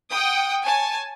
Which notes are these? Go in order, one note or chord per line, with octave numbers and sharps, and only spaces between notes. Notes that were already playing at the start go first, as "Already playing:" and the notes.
F#5 G5 D#6
C#5 G#5 A5